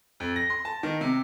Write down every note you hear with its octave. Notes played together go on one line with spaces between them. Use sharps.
F2
A#6
C6
A5
D#3
C3